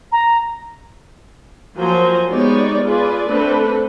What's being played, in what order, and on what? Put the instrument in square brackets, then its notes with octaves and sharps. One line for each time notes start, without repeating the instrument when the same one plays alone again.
[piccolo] A#5
[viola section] F3 F#3 A#3 C5 G#5 A#5
G#3 B3 D#4 G4 C#5 D5
F4 G#4 B4 D5
A3 C4 D4 A4 B4